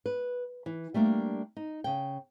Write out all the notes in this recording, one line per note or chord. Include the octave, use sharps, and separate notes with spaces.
B4
E3
G3 A3 A#3 D4
D#4
C#3 G5